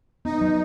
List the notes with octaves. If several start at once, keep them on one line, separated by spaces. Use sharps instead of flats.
B3 D#4
F#3